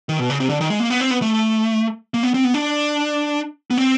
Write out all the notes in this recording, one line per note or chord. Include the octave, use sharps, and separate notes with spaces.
D#3
B2
C#3
C3
D3
D#3
G#3
A#3
B3
C4
B3
A3
A#3
B3
C4
B3
D4
B3
C4